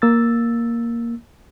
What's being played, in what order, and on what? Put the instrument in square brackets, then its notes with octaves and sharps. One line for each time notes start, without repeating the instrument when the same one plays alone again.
[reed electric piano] A#3 E6 A6